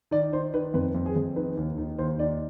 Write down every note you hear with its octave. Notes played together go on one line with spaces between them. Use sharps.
D#3 D5
D#3 C5
D#3 B4
F2 B4
F2
G#4
F2
D#3 B4
D#2
D#3
D#2 C5
D#3 D5